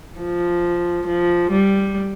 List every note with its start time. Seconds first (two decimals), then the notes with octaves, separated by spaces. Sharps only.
0.19 F3
1.07 F3
1.51 G3